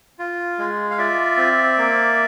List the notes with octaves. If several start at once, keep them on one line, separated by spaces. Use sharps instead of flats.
F4
G#3
F5
F4 D5 E5
C4
A#3